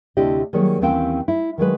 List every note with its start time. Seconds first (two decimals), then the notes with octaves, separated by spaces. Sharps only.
0.17 D2 C3 D4 E4 G4 D#5
0.53 D#3 F#3 G3 A#3 G#4 C#5
0.82 D#2 E3 C4 C#4 F5 G5
1.28 E4
1.58 D#3 F#3 G#3 B4